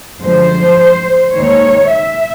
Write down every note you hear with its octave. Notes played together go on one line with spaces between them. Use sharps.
F#2 D3 F3 G#3 C5
D#2 D#3 G#3 C#5
E5